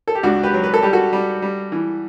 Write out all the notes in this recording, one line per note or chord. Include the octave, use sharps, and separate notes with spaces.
A4
G4
C#2 D4 F#4
G4 B4
F#3
B4
A4
G3 G4
F#4 A4
G3
G3
E3